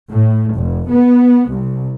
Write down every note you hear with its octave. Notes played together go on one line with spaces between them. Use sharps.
A2
F1
B3
C2